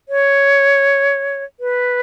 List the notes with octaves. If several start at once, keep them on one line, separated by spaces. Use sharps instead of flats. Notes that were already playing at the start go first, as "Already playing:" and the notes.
C#5
B4